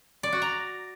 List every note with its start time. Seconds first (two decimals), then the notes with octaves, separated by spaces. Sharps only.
0.23 D5
0.33 F#4
0.42 A#5